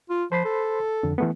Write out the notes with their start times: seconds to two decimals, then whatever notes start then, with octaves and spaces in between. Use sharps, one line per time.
0.10 F4
0.32 F3 C5 B5 C6
0.45 A4
1.03 F2 D3
1.18 E3 A3 B3